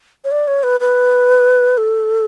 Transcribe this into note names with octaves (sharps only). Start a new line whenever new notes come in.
C#5
D5
C#5
B4
B4
A4